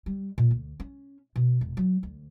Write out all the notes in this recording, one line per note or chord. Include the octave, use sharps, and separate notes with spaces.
G3
A#2
D2
C#4
B2
E1
F#3
D2